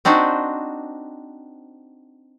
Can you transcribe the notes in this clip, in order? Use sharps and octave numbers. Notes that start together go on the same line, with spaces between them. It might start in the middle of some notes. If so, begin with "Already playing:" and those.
C4 D4 D#4 F#4 C5